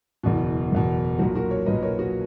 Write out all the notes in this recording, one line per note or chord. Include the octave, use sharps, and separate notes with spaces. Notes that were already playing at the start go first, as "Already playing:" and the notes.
F#1 E2 B2
F#1 E2 B2
B1 A#2 F#4
F#4 A#4
A#4 C#5
B1 A#2 B4 D#5
A#4 C#5
F#4